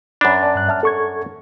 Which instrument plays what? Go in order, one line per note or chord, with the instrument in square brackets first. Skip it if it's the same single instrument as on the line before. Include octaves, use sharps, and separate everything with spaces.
[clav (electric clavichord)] F#2 D4 [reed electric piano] D5 B5
[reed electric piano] D5 A5
G2 F#6
E5 A5 F6
A4 C#6 G#6